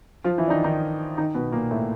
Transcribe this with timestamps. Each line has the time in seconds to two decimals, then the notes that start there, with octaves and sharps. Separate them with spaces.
0.24 F3 F4
0.38 E3 E4
0.47 D4
0.50 D#3 D#4
0.64 D#3 D#4
1.17 D#3 D#4
1.34 B2 B3
1.52 A#2 A#3
1.71 A2 A3